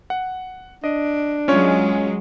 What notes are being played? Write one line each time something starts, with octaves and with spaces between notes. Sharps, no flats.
F#5
D4 D#5
F#3 G#3 C#4 F4 C#5